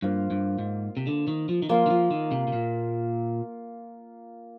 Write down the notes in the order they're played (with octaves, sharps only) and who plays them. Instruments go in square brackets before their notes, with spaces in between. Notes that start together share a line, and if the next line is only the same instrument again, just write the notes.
[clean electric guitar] G2 [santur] A#3 F4 C5 F5
[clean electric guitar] G2
G#2
C3
D3
D#3
F3
D#3
[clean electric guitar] F3 [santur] A#3 F4 A#4 F5
[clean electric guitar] D#3
F3
D#3
C3
C3
A#2